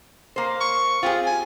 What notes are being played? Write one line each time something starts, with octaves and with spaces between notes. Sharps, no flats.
A#3 C5
C#6
C4 F4 G4 G#4
G#5